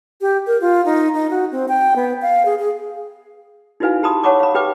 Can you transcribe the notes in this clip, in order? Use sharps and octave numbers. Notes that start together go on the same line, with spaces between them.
G4
A#4
F4
D#4
D#4
F#4
C4
G5
B3
F5
G#4
G#4
D#4 E4 F#4 B4 F5 G#5
G4 A5 B5 C6 D#6
C#5 F#5 A5 B5 C#6 D6
F5 B5
G4 B4 G5 D6